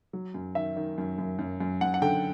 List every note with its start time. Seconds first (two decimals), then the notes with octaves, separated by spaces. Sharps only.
0.13 F#3
0.34 F#2
0.55 D#3 E5
0.76 D#3
0.98 F#2
1.18 F#2
1.39 F#2
1.60 F#2
1.81 F#2 F#5
1.94 F#5
2.02 D3 G5